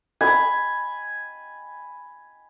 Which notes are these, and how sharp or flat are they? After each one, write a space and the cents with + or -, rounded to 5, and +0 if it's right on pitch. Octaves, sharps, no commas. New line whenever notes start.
G#5 +0 B5 +0